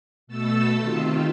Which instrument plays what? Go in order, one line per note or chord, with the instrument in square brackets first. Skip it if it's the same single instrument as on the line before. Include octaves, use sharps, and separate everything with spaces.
[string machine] B2 A3 A4 A5 E6
C3 D#3 F4